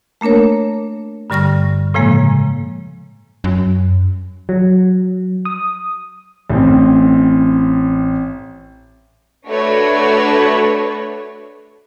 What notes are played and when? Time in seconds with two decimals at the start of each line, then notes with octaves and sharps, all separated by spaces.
0.21 A3 A#3 D4 A#4 C#5
1.30 G2 D3 G3 C#6 F6 A#6
1.94 A2 C#3 F3 G#3 A#3
3.44 F#2
4.49 F#3
5.45 D#6
6.50 A1 A2 C4
9.47 A3 D4 F#4 B4 C#5